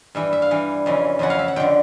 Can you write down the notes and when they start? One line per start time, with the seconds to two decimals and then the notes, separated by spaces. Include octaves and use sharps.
0.15 G2 E3 E5
0.33 E5
0.42 F5
0.51 G2 E3
0.86 F2 C#3 E3
1.19 F2 C#3 E3 F#5
1.30 F5
1.39 E5
1.48 F#5
1.56 F2 D3 G5